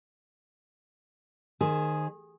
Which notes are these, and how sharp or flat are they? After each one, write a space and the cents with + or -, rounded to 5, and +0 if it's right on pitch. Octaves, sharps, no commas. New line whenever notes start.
D#3 -20 G#4 +0 C5 +0